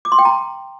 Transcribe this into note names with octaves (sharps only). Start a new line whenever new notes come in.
D6
C6
G5
A#5